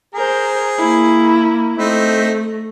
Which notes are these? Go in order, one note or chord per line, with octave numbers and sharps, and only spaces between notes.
G#4 A#4 C5
A#3 E4
A3 C4 D#4 E5